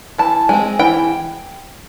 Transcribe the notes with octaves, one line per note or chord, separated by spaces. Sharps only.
E3 A5
G#3 C4 G#5
E3 G5